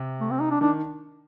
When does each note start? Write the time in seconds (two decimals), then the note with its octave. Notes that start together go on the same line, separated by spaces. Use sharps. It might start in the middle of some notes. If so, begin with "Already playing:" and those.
Already playing: C3
0.20 A3
0.31 C4
0.41 D#4
0.51 D4
0.61 D#3 D4